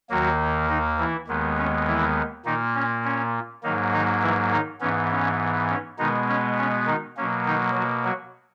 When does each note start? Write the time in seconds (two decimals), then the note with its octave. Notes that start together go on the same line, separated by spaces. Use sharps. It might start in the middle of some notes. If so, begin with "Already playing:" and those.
0.10 D#2 D#3 F#3 A#3 F#4
0.69 D#3 D#4
0.98 E3 E4
1.28 D#2 D#3 G#3 B3
1.58 C#4
1.87 E3 E4
2.45 A#2 D#3 A#3 D#4
2.75 C#4
3.04 C#4
3.63 G#2 D#3 F#3 A#3 D#4
3.92 D#3 D#4
4.22 E3 E4
4.51 D#3 D#4
4.80 G#2 E3 B3 C#4
5.11 C#4
5.69 C#4
5.98 B2 D#3 G#3 B3 D#4
6.28 C#4
6.58 C#4
6.86 D#3 D#4
7.17 B2 F#3 A#3 C#4
7.46 D#3 D#4
7.75 F#3 F#4
8.04 F#3 F#4